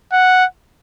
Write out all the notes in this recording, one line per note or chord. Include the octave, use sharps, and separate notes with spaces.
F#5